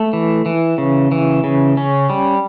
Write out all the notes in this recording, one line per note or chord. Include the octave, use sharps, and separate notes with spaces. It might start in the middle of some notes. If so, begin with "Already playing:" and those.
Already playing: A3
E3
E3
C#3
E3
C#3
C#4
G3